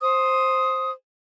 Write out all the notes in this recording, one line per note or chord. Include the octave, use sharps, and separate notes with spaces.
C5 D#6